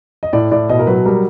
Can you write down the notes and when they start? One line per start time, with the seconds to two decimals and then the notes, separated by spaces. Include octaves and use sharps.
0.23 D#5
0.33 A2 D5
0.51 A2 D5
0.69 B2 D#5
0.79 A#4
0.87 F#3 B4
1.05 G3 A#4